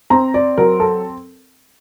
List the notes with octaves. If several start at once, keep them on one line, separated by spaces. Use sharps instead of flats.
C4 A#5
D5
F#3 A#4
A4